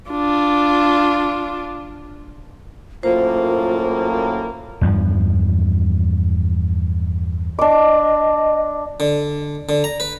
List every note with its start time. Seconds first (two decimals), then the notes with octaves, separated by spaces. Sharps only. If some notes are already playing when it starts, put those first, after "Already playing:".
0.10 D4 F4
3.03 F#2 A2 A#3 F4 C5
4.81 E2 G2 F3
7.59 D4 D#5 D6
9.00 D3
9.69 D3
9.84 A#5
10.00 B4